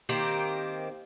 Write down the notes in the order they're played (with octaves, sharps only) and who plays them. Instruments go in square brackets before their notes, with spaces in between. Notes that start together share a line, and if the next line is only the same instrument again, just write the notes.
[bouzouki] D#3 A#3 C4 G4